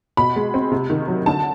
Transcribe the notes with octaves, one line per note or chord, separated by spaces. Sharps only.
B2 B5
G#3
C4
C3
D#3
F#3
D3 A5